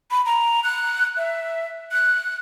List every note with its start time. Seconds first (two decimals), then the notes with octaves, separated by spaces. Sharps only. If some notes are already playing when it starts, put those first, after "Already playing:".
0.11 B5
0.26 A#5
0.64 F#6
1.17 E5
1.92 F#6